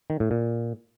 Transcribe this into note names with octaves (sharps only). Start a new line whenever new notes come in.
D#3
A2
A#2